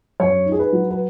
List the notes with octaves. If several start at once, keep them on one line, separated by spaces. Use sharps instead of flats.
F#2 C#5
D#4
G#4
B4
F#3
B4